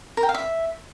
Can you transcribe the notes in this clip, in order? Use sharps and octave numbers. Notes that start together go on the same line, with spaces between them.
A#4
G5
F5
E5